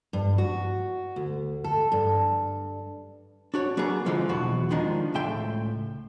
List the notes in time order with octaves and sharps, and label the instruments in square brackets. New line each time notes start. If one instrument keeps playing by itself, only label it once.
[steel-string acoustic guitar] G2
F#4
D2
A4
G2
[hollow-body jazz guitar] D4 F#4 C#5
F#3 A#3 B3 F#4 G#4
D3 E3 F3 G#3
B1 E2 B2 F#4
D#3 F3 G#3 D4 D#4
C#2 A2 E5 G5 C6